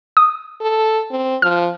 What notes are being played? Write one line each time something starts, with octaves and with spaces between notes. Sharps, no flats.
D#6
A4
C4
F3 F6